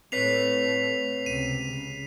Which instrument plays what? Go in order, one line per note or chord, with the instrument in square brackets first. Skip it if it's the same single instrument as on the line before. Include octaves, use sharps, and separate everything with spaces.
[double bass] A2 A3 [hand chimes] C4 B4 C#5 [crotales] B6 C7 F7
[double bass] C#2 C3 [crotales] D#7
[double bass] C#3